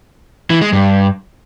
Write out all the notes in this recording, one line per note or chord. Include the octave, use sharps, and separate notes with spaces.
E3
G#3
G2